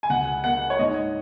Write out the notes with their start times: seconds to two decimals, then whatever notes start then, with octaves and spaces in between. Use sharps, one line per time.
0.03 G#5
0.09 C#2 F#5
0.44 A#3 F#5
0.70 C#5
0.79 G#2 D#5